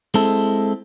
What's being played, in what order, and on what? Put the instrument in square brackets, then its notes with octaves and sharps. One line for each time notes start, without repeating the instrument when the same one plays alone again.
[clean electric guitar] G#3 C4 E4 A4